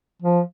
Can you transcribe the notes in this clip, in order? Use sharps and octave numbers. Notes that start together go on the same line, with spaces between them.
F3